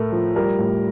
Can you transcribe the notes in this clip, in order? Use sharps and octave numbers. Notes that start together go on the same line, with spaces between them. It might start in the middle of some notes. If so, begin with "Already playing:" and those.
Already playing: A2 A3 A#4
F3
G3 A#4
A2